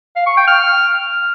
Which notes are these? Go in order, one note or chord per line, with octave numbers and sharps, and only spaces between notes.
F5
C#6
G5
F6